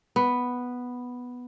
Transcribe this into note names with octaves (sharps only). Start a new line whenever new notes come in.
B3